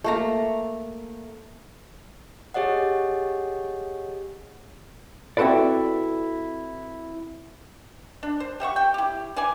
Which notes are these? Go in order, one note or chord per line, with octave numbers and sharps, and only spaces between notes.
A3 A#3 A#5
G4 G#4 C#5 D#5 F#5
C4 E4 F#4 A4 B4 D5
D4
C5
G4 E5 F#5 C#6
G5
E4 G4
E3 D5 G#5